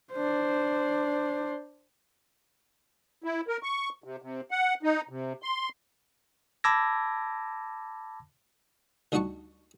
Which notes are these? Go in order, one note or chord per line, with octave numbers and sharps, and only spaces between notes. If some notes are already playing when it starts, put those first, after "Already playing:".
D4 C5
E4
A#4
C#6
C3
C3
F#5
D#4
C3
C6
A5 B5 D6 E6 G#6 A#6
D2 G3 D#4 F#4 A5 C#6